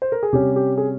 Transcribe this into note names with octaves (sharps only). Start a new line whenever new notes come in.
C5
A#4
G#4
C3 G3 C#4 G4
G4
G#4